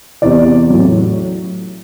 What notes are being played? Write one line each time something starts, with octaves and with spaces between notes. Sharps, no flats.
E2 C3 E3 D5
A2 F#3